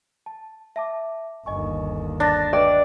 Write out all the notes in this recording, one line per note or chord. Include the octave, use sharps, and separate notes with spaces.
A5
E5 A5 D6
G1 D#2 D#5 G#5 C#6
D4 A6 A#6
B4 D5 D#5 G5